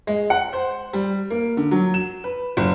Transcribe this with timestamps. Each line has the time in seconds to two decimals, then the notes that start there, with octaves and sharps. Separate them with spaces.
0.07 G#3
0.30 F#5
0.53 C5
0.93 G3
1.30 A#3
1.57 D3
1.71 F#3
1.94 E7
2.24 B4
2.57 F#1